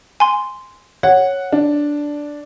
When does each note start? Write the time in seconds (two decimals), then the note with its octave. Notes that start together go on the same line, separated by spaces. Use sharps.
0.20 G#5 C6
1.03 C#5 F#5
1.52 D4